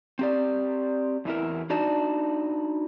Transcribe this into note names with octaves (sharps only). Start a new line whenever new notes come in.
C4 G4 D5
E2 E3 E4 A#4
D4 D#4 F#4 D5 A5